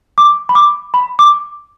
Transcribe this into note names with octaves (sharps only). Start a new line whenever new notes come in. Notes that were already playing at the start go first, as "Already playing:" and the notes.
D6
B5
D6
B5
D6